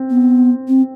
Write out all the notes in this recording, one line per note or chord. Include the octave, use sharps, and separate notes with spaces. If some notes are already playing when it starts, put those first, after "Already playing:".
Already playing: C4
B3
C4